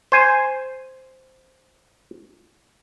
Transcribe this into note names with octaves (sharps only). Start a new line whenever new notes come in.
C5 G#5